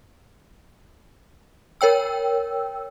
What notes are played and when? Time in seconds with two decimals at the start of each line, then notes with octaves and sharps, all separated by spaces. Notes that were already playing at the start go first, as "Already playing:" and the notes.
1.81 A#4 C#5 G5 E6